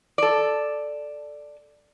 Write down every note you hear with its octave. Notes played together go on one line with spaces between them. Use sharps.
A4 D5